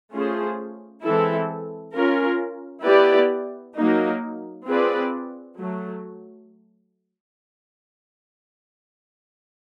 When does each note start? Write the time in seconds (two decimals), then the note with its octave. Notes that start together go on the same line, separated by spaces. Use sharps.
0.12 A3 C#4 F4 G#4 C5
1.03 E3 G#3 C4 E4 A4
1.94 C#4 F4 A#4
2.84 B3 E4 G4 B4 D5
3.75 F#3 A#3 D#4
4.66 C4 F4 G#4 B4 D5
5.58 F#3 A3